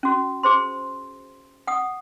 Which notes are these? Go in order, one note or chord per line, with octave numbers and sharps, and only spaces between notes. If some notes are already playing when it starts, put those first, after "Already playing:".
C#4 F#4
G#4 C5 C6
F#5 D#6